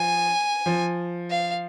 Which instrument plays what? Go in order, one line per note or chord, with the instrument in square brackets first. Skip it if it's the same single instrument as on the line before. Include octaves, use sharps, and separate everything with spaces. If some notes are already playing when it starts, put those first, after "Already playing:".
Already playing: [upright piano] F3 [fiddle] G#5
[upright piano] F3
[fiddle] F5